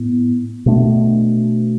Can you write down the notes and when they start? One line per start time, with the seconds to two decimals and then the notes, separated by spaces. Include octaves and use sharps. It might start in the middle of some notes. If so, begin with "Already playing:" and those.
Already playing: A2 B3
0.66 B2 A3 D4